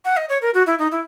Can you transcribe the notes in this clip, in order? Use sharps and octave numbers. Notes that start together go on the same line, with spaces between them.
F#5
D#5
C#5
A#4
F#4
E4
D#4
E4